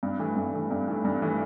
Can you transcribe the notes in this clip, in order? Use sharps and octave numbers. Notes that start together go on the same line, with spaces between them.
G2
E3 A3
G2
E3 A3
G2
E3 A3
G2
E3 A3